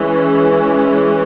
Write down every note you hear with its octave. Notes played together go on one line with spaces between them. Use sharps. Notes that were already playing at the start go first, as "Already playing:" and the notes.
Already playing: E3 G#3 C#4